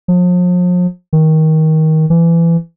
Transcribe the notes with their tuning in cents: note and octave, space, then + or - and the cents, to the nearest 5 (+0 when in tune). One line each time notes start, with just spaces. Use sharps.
F3 +40
D#3 +20
E3 +25